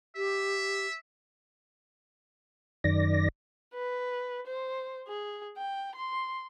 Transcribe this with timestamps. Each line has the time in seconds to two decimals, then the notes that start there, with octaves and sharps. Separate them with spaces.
0.16 G4 E5
2.84 F#2 D#3 D5 A#6
3.74 B4
4.46 C5
5.08 G#4
5.57 G5
5.95 C6